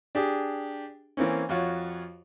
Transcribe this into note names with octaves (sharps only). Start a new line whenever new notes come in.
D4 G4 G#4
E3 A#3 C4 C#4
F2 F4 F#4 C#5